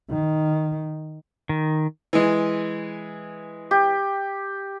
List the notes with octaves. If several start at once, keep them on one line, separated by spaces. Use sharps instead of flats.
D#3
D#3
E3 G#3
G4